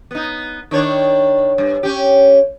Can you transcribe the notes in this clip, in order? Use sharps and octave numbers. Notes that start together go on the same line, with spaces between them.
B3 D#4
D#3 D4 C#5
G2
C#4 G4